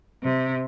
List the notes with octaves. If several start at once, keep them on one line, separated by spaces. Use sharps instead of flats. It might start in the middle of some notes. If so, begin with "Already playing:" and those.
C3